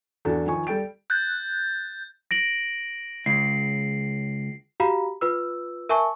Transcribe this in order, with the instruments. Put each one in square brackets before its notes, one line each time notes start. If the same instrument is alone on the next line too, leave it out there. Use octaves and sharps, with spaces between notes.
[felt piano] E2 D4 F#4 A4
D#3 F3 G#5 C#6
G3 A4 G5 D7
[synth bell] F#6 [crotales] G6 A6
[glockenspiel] A#6 D7 F#7
[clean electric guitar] C#2 [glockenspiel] C7
[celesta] F#4 G4 F5 A#5 B5
F4 B4 E6
A#4 E5 G#5 A5 C#6